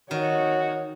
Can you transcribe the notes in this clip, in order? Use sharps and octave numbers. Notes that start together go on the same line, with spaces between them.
D#3 F#4 C#5 D#5